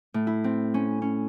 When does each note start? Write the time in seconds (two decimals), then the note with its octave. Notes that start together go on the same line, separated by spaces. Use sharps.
0.14 A2
0.27 E4
0.44 C4
0.74 C#4
1.02 C#4